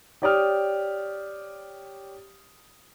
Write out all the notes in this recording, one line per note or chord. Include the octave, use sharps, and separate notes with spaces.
G4 C#5 D5 G5 D#6 F6